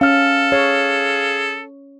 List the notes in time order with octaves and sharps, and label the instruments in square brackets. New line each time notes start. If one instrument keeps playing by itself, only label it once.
[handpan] C#4 [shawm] A4 [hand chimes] F5 F6
[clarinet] G#4 [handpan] C#5